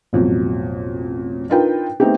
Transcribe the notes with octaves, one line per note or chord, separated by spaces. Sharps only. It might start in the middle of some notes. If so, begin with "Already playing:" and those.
A1 F2 B2 F#3
D4 D#4 F4 A#4 B4 G5
A3 B3 C4 D#4 G4